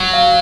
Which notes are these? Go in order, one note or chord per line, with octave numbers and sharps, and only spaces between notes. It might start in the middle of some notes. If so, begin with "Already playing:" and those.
Already playing: F#3
F5